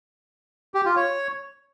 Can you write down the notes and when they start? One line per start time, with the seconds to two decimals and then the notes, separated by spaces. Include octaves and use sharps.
0.74 G4
0.85 F4
0.96 C#5